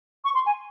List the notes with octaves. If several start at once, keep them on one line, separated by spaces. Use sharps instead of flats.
C#6
C6
G#5